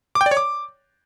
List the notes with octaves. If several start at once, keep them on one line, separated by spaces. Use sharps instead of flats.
D6
G5
D5
C#5
D6